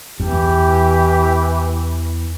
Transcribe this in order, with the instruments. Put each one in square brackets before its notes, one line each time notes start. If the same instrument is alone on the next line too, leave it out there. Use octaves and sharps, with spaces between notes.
[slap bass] E2 [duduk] E3 [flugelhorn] G4